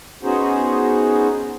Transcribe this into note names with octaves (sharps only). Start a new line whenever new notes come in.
B3 C#4 D#4 F#4 G#4 C5